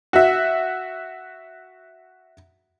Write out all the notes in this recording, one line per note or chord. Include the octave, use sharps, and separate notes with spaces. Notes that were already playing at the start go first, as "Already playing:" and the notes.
F#4 E5